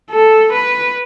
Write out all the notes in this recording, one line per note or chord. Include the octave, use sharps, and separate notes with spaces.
A4
B4